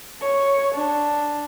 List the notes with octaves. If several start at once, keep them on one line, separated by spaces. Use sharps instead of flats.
C#5
D4